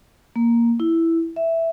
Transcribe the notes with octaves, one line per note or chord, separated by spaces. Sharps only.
A#3
E4
E5